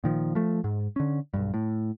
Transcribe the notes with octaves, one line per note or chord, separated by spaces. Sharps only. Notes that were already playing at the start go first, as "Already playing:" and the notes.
A#2 D#3 F3
F3 A3
G#2
D3 C#4
B1 E2 G2
A2